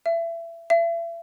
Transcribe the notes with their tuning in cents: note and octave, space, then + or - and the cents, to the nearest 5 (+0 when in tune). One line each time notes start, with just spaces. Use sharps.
E5 +25
E5 +35